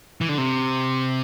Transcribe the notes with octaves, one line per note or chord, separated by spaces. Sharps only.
E3
D3
C3